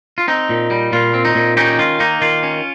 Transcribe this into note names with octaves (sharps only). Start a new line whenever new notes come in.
F4
C4 D#4
A#2
G3
A#2 F4
C4
D#4
A#2
C#4 D#4 G4
D#3 F4
A#3 D#4
D#3 F4
C#4